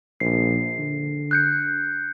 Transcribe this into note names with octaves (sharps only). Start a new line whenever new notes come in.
A#1 C7
D3
F#6 G6 C#7